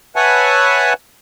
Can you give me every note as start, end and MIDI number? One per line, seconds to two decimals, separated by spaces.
0.16 0.93 71
0.16 0.93 73
0.16 0.93 76
0.16 0.93 78
0.16 0.93 80
0.16 0.93 81